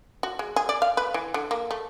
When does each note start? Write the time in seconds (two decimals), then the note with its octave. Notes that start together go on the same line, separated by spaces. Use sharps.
0.23 F#4
0.39 G#3
0.56 G#4
0.69 D5
0.82 F5
0.97 B4
1.14 E3
1.34 D3
1.51 A#3
1.71 A3